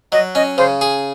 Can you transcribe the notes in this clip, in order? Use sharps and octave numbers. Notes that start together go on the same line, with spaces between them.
F#3 D#5
C#4 D#5
C#3 C5
G#4